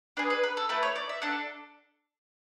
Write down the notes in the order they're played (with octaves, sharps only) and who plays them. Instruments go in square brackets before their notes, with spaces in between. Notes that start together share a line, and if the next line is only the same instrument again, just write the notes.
[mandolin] D4 G#4 B4
B4
B4
A4
A3 E4 A4 B4
C#5
D5
E5
D4 A4 F#5